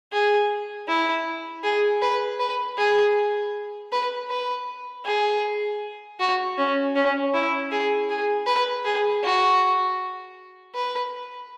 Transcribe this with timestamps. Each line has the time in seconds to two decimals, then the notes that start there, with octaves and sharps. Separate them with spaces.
0.12 G#4
0.88 E4
1.63 G#4
2.02 B4
2.39 B4
2.78 G#4
3.92 B4
4.30 B4
5.05 G#4
6.19 F#4
6.58 C#4
6.95 C#4
7.34 E4
7.71 G#4
8.09 G#4
8.47 B4
8.85 G#4
9.23 F#4
10.75 B4